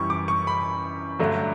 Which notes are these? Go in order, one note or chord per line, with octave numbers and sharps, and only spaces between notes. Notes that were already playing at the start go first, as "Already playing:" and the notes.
Already playing: F#2 E3 G3 C#6
D6
C#6
B5
G2 D3 F#3 A3